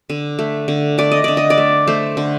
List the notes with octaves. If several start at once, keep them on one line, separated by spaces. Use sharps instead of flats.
D3
A3
D3
A3 D5
D#5
D3 D5
D#5
D5
A3
A3 C5
D3